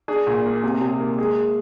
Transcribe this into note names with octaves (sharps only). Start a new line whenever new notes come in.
D4 G#4
A#2
A#3
C3
C3
A#3
G#3 G#4